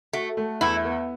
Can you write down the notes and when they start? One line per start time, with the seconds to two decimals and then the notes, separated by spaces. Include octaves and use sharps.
0.13 A3 F#4
0.37 A3
0.61 E2 E4
0.85 B3